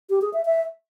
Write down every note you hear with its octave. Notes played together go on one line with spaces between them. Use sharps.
G4
G#4
E5
E5